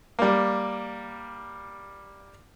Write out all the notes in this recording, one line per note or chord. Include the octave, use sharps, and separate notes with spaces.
G3 A#3